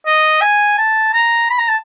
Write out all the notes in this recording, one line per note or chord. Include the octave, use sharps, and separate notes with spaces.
D#5
G#5
A5
A#5
B5
A#5
A5